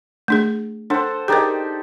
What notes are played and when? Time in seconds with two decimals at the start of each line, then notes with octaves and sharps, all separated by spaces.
0.28 A3 D4 G#4
0.90 D4 A4 C5 F#5
1.28 D4 D#4 G4 G#4 A#4